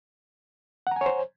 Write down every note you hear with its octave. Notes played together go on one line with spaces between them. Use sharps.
C5 C#5 F#5 G#5 A#5